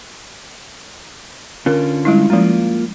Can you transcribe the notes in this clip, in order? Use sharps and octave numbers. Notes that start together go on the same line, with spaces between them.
D3 C#4 F4 A#4
G3 G#3 E4
F3 G#3 A#3 C#4 F4